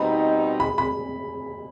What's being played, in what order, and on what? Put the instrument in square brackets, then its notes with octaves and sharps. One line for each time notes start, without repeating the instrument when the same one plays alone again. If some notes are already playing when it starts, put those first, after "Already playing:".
Already playing: [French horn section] B2 G3 C4 D#4 [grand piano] B5
[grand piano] B5
B5